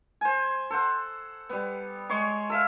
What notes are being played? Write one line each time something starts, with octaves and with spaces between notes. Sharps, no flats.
C5 G#5
A4 C5 F#5
G3 B3
G#3 C#5 C6 C#6
A4 E5 F5